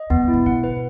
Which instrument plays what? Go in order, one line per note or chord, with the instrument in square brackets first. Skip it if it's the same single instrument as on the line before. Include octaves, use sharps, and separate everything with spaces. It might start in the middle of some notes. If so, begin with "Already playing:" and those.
Already playing: [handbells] D#5
[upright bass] E2 [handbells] B3
[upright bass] F#2
[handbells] E4
[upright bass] A2
[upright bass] B2 [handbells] F#5
[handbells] B4